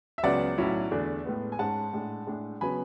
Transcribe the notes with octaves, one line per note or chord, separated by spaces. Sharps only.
E5
C#2 C#3 F#3 B3 D5 F#5
B1 A2 F#3 C#4 E4
E2 D3 A3 D4
A2 G#3 B3
G#5
G#2 G#3 C#4 F#5 A5
A2 G#3 D4
A2 G#3 D4
C#3 F#3 B3 G#5 B5